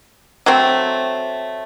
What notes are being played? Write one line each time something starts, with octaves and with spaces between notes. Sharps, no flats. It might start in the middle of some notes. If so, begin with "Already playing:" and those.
F#3 A3 C4